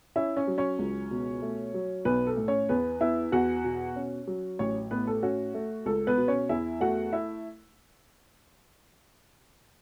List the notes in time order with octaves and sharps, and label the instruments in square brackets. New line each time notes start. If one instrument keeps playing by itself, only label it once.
[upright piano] C#4 E4 E5
C#4 C#5
F#3
C#4 C#5
C#2
B2
A3
F#3
B1 B3 B4
A4
A2
C#4 C#5
E2 B3 B4
B3 E4 E5
E2 F#4 F#5
B2
C#4
F#3
A1 C#4 C#5
A2 B3 B4
A4
C#4 F#4
A3
C#2 A4
B3 B4
B2
C#4 C#5
E2 E4 E5
A3 F#4 F#5
E4 E5